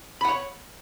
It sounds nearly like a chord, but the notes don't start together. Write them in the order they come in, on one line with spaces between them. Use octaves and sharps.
B5 F#5 C#5